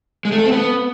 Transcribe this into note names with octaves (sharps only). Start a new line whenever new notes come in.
G#3
A3
A4
C4
B3